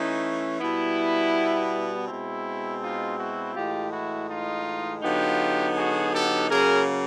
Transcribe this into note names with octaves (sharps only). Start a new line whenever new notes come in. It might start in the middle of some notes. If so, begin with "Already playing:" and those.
Already playing: E3 A3 C#4 D#4
B2 G3 B3 E4
B2 G#3 C4 E4
D#4 F4
E4 F#4
A2 E3 G#3 F4 G4
E4 F#4
D#4 F4
D3 F#3 B3 D#4 F4 G4
F#4 G#4
G4 A4
C#3 F#3 A#3 G#4 A#4